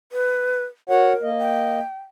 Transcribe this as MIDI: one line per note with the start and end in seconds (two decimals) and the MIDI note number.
0.12 0.64 71
0.90 1.13 66
0.90 1.31 70
0.90 1.13 73
0.90 1.13 78
1.23 1.79 58
1.23 1.79 75
1.39 1.97 79